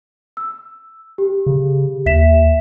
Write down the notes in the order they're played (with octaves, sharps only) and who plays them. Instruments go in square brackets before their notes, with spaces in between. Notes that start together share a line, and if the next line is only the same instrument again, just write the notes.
[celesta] E6
G4
[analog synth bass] C#3
[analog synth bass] D#2 [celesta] E5 B6 E7